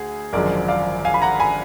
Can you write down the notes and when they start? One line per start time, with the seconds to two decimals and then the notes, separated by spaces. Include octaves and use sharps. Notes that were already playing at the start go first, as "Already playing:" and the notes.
Already playing: D2 G#4
0.33 G#1 F#2 D3 F3 G#3 A#4 D5
0.68 D5 F5
1.05 F5 G#5
1.14 B5
1.22 F#5 A#5
1.40 G#5 B5